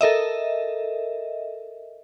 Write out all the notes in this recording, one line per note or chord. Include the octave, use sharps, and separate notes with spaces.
A4 A#4 D#5 E5